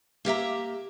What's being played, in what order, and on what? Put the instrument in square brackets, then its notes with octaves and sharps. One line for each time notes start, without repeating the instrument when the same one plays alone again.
[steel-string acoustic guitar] A#3 G4 E5 A#5